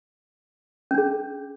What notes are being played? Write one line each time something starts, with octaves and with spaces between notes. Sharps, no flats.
C#4 D4 G#4